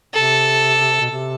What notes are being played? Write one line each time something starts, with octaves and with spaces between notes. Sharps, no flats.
C3 A4
B2
C3